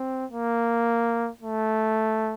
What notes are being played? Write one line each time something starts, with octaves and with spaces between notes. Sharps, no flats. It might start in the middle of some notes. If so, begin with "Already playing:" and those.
Already playing: C4
A#3
A3